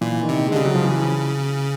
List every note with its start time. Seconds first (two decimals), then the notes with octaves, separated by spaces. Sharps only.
0.01 A#2 E3
0.23 D#3
0.29 C3
0.46 G#3
0.52 D3
0.55 C#3 G3
0.65 F#3
0.75 F3
0.83 E3